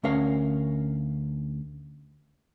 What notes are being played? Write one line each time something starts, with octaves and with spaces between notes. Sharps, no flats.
D2 C#4 A#4 F5